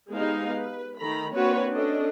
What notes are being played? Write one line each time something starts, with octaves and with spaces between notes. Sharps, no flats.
G#3 B3 D#4 G4 C5 F5
B4
D#3 A3 A#5 B5
A#3 C4 D4 F#4 B4 C#5
C#4 D4 A4 D#5